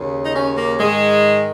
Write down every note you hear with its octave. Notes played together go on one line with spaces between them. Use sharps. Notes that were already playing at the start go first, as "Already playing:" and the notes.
Already playing: D#2 C#3
D#4
C#4
A#3
G#2 D#3 G#3